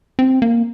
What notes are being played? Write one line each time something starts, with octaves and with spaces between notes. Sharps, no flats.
C4
A#3